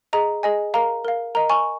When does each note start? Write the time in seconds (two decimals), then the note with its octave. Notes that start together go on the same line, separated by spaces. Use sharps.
0.13 G#4 D#5 A#5
0.43 G#4 D#5 G#5
0.74 A#4 F5 A#5
1.05 A#4 F5
1.35 A#4 D#5 A#5
1.50 G#5 C#6